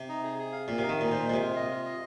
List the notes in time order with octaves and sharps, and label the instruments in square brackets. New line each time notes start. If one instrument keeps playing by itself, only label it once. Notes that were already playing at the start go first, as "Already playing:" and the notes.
Already playing: [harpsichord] C3
[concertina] D#4
G#4
G#4
F5
[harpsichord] A#2 [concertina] F5
[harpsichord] C3 [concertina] D#4
[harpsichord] D#3
[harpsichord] A#2 [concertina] D#4
[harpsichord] A#2 [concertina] C5
[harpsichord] A#2 [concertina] G#3
[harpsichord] C3
[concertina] F4
D#5
F4
D#5